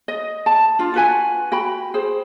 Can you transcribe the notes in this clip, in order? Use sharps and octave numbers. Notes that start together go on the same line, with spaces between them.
D#5
A5
D4 F4
F4 F#4 B4 G#5
F#4 G5 B5
G#4 C5